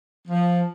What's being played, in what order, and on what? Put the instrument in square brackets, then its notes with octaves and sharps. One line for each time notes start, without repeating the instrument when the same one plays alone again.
[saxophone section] F3